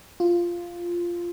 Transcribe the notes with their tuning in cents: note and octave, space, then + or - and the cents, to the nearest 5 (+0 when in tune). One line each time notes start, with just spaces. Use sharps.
F4 -5